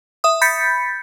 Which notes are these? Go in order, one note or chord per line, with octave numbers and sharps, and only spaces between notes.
E5 D#6
B5 G6 A6 B6 C#7